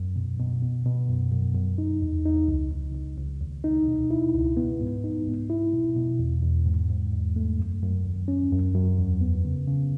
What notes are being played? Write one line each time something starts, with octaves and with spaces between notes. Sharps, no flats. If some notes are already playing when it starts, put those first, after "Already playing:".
Already playing: F#2
B2
B2
B2
B2
F#2
F#2
F#2
D#4
E2
D#4
C#2
C#2
C#2
C#2
D#2
D#4
B2
E4
C#2
B3
G#2
D#4
G#2
E4
B2
B2
E2
E2
G#2
G#2
E2
A3
F#2
F#2
D#2
C#4
F#2
F#2
E2
B3
C#3
C#3